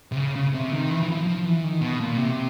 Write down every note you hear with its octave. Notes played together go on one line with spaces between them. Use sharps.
C3
C#3
C#3
C3
D#3
E3
E3
F3
F3
E3
D#3
B2
A#2
C3